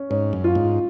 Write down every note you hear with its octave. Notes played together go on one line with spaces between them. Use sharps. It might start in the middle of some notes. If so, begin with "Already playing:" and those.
Already playing: C#4
G#2 C#4
F#2
F4
G#2